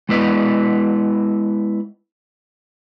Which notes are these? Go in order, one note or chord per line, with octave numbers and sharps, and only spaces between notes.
G#3 B3 E4 B4 D5 D#5